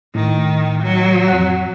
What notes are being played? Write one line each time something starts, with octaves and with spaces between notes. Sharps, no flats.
A2 D#3
F#3
F2 F#5